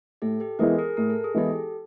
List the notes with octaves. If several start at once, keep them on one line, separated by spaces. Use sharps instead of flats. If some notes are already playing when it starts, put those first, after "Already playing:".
A2 G4 A4
G4 A4
E3 G#3 B3 E4 G#4 A#4
G#4 A#4
A2 A#4
A4
G#4
E3 G#3 B3 E4 G4 A4